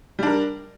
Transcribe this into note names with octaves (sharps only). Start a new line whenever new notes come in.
G3 D4 A#4